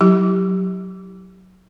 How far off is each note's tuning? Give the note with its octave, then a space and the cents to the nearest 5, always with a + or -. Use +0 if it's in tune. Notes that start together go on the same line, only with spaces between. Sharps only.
F#3 +0 E4 +0 G4 +0